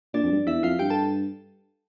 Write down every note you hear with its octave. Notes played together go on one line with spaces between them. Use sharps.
A#2 D4 D5
F2
G2
E2 E4 E5
F2 F4 F5
G2 G4 G5
A4 A5